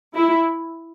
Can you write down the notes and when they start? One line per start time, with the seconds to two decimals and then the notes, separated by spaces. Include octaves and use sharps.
0.15 E4